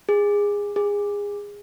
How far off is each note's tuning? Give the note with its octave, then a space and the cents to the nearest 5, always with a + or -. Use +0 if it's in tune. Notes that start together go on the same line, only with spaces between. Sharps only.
G#4 -20
G#4 -25